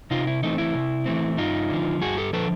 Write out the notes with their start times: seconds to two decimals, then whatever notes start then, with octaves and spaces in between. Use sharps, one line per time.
0.11 C3 D#4 F4
0.27 E4
0.43 E3 A3 C4 D#4
0.58 E4
0.75 C3
1.06 E3 A3 C4
1.38 G2 D#4 F4
1.70 D3 F3
2.01 G2 F#4 G#4
2.17 G4 A4
2.33 D3 F3 A4 B4